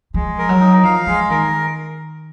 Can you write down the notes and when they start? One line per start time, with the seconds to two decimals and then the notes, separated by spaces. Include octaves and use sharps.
0.14 F3 G#3
0.38 A#4
0.49 F#3
0.60 D#4
0.83 F3 F5
1.07 F3 G#3
1.30 D#3 A#4